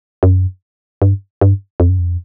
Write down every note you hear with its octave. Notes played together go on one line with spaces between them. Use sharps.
F#2
G2
G2
F2
F#2
F2